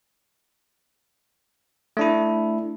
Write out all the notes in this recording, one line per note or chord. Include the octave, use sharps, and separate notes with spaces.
A3 D4 E4